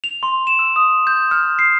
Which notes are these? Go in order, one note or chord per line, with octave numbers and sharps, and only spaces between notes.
F7
C6
E7
E6
D#6
G6
F6
C7